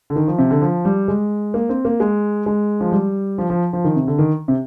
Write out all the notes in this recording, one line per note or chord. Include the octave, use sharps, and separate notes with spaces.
D3
D#3
F3
C3
D3
F3
G3
G#3
A#3
C4
A#3
G#3
G#3
F3
G3
F3
F3
F3
D#3
C3
D3
D#3
C3